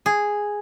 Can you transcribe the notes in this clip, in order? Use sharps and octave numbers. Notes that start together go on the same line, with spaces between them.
G#4